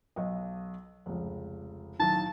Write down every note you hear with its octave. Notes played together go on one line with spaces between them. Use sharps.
B1 D#5
F1 C#2
B1 A2 D#3 A5